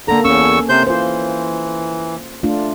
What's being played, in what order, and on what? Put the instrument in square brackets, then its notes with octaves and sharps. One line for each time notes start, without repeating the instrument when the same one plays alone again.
[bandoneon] D3 A#5 [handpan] A#3 A4
[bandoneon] E2 C#6 E6 [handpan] C#4
[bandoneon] C3 C5 G6
[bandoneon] E3 [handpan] F4 C5
[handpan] A3 D4 F4